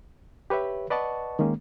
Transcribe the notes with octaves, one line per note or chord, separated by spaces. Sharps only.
G4 B4 C#5 E5
B4 D5 D#5 F#5 A5 C#6
D#3 G#3 A#3 C#4